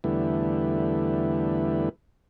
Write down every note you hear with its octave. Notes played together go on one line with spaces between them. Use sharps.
E2 D3 G3 A3 B3 E4